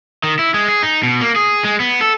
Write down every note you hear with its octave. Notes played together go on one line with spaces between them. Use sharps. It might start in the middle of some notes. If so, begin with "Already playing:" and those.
D#3
E4
G#3
G#4
D#4
B2
A#3
G#4
G#3
B3
A4